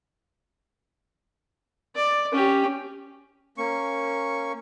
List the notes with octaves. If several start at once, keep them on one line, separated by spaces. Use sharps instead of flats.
D5
C#4 G4
A#3 C#4 C#6